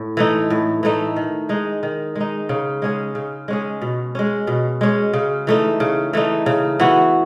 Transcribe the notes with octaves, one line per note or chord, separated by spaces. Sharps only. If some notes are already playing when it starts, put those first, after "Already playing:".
Already playing: A2
E3 A3 D#4
A2
E3 A3 D#4
D#3
G#3 D#4
D#3
G#3 D#4
C#3
G#3 C#4 G#4
C#3
G#3 C#4 G#4
B2
G#3 C#4
B2
G#3 C#4
C#3
E3 A3 D#4
C#3
E3 A3 D#4
C#3
E3 B3 F#4